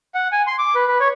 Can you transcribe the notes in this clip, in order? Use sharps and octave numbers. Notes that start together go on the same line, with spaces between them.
F#5
G#5
C6
D6
B4
B4
C#5